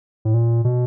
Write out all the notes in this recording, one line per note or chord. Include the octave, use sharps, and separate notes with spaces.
A2
A#2
B2